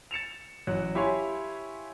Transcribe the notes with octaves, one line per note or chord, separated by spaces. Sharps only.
A6 C#7 E7 F7
A1 F#3 F#6
E4 G4 C#5 F5 G#5 C6